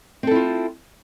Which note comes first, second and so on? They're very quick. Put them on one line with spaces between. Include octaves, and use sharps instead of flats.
C4 A4 E4 F4